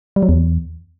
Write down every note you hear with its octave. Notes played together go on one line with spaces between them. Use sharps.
G3
F#3
E2